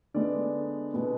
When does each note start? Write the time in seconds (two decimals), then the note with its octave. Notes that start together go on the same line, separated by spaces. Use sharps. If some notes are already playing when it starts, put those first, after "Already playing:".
0.14 D3 G#3 B3 D5
0.94 B2 G#3 B3